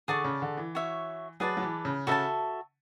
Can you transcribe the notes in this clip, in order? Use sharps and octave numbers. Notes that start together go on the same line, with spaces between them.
D3 G#4 D5 A5 C#6
C#3
D3
E3
F#4 C#5 E5
F#3 G#4 B4 D5 A5
F#3
E3
C#3
C#3 F#4 A4 E5 A5